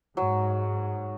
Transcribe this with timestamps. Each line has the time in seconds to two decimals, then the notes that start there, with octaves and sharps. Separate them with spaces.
0.17 G#2 F#3